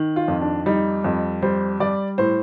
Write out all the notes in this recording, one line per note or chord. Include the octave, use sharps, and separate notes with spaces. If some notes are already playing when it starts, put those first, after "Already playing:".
Already playing: D#3
F4
F2
D4
G3 D#4
F2
G3 C5
G3 D5
A2 C5